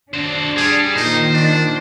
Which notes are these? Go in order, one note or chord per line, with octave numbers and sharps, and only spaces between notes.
D4 F#4 C5
G3 G#4
A#2 D#3 D#4 C5
D4